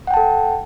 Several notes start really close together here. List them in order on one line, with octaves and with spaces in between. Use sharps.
F#5 G5 A5 A4